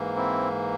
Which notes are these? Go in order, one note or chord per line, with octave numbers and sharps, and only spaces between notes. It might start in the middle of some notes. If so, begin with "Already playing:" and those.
Already playing: G#2 E3 A#3
C4 E4